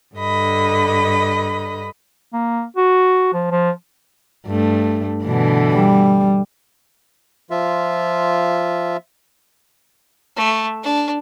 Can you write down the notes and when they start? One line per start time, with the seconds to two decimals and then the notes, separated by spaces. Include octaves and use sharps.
0.16 G2 D3 D#5 B5
2.33 A#3
2.77 F#4
3.33 F3
3.51 F3
4.47 G2 A3
5.24 B2 D3 E3
5.74 G3
7.50 F3 F4 E5
10.37 A3
10.83 D4